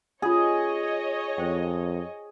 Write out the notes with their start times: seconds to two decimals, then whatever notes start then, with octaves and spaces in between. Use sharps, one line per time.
0.22 C#4 F4 G#4 C#5 D#5
1.38 F2 C5 G5